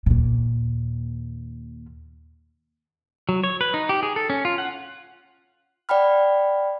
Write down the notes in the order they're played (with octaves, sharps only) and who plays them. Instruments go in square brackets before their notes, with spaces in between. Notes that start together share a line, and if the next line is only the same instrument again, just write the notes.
[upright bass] D#2 A#2
[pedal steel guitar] F#3
C#5
B4
D#4
G4
G#4
A4
C#4
F4
F#5
[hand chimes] D5 F#5 G5 B5 F6